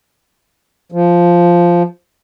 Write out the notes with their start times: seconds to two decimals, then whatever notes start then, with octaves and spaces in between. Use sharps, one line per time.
0.92 F3